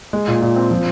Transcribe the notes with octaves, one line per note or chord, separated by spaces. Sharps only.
G#3
A#2
A#2
C4
F3